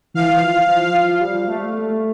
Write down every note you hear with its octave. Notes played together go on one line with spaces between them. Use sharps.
E3 F5
F3
F3
F3
G3
A3
A3